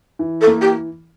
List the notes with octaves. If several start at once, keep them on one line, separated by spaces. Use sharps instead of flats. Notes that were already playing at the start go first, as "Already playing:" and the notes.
E3
A4
A#3
G4